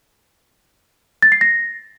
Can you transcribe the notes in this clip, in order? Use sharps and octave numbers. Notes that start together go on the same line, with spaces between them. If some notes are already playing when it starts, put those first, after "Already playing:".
A6
C7
A#6